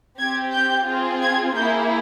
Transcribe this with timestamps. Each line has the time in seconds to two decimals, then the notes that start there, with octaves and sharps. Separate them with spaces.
0.18 C4 G4 G#6
0.52 G6
0.87 C4 F4 G#4
1.22 G#6
1.55 A#3 E4 G#4 G6